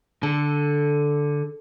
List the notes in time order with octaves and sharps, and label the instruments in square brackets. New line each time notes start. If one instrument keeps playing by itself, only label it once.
[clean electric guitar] D3 [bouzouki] A4